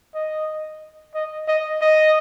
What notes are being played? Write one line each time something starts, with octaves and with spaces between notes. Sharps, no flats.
D#5
D#5
D#5
D#5